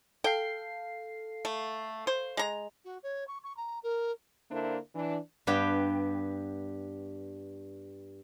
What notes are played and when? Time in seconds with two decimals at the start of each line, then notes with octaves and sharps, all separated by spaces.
0.24 A4 F5 G5 C7
1.45 A3
2.07 C5
2.37 G#3 A#5
2.85 F#4
3.03 C#5
3.28 C#6
3.44 C#6
3.57 A#5
3.83 A#4
4.51 D3 A#3 D4 E4 A#4 C5
4.95 E3 D4
5.47 G2 B3 G4 G5